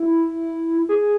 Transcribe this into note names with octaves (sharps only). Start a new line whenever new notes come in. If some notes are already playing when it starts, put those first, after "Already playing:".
Already playing: E4
G#4